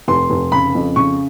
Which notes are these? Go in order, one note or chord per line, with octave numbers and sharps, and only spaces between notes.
F1 C6
F1
C#3 B5
F2
C#3 C#6